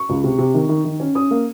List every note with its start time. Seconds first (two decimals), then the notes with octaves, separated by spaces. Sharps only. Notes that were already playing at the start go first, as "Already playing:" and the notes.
Already playing: C#6
0.09 C#2
0.24 C3
0.38 C3
0.54 D#3
0.69 D#3
0.85 D#3
1.00 C#4
1.15 C#4 D#6
1.31 A#3